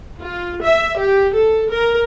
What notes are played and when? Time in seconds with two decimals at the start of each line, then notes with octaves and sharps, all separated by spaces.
0.17 F4
0.61 E5
0.96 G4
1.33 A4
1.69 A#4